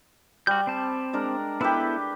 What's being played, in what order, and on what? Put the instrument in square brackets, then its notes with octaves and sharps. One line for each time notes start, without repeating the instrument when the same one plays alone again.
[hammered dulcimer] G3 [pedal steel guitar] F#4 G6
[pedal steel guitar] C4 A5
[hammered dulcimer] G#3 D4 A#4
[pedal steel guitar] B3 E4 A4 [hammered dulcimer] G4 B4